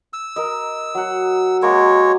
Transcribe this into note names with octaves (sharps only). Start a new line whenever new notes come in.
E6
A#4 D#5
F#3 F#5
G#3 A#3 F#4 C#5